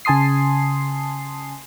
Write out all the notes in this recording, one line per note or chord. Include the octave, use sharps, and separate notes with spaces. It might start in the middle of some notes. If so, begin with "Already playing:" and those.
C#3 G#5 A5 C6 D#6 C7